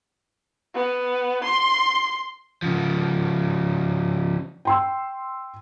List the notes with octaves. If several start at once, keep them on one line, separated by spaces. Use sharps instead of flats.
B3
C6
C#3 F3
G5 C6 E6